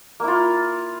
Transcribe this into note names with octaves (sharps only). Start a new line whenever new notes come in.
A#3 E4 F4